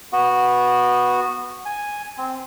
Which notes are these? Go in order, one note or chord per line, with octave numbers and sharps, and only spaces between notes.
B3 F#4
G#5
C4